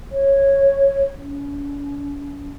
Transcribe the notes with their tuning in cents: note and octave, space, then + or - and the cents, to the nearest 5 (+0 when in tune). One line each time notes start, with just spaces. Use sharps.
C#5 -10
C#4 +40